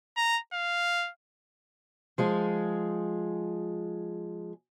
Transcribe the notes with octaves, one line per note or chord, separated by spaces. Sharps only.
A#5
F5
F3 G#3 G#4